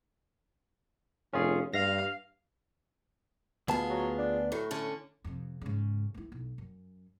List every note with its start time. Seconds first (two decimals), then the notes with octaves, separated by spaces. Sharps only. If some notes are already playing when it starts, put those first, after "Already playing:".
1.33 F1 C#4 F4 G#4
1.74 G2 F5 A#6
3.68 D2 B2 B3 F4 G#4 A5
3.90 F#3
4.18 D4
4.52 A2 F#3
4.71 D3 C#4
5.24 F2 C3
5.61 G#2 C#3
6.14 A#3 E4
6.32 B1
6.58 F#2